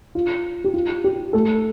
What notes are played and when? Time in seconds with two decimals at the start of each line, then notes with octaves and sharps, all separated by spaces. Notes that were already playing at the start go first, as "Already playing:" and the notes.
0.15 F4
0.64 G4
0.74 F4
1.04 G4
1.33 A3 A4